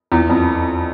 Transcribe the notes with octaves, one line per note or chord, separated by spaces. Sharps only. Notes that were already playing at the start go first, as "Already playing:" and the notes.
E2
F2